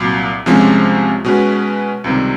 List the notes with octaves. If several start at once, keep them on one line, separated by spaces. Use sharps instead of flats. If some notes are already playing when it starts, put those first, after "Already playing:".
Already playing: C2 A#2 F#3
C2 C3 F3 G#3 C#4
B2 G#3 C#4 F#4 B4
C#2 C3 D#3 G3